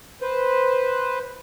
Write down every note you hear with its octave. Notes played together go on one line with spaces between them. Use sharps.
B4 C5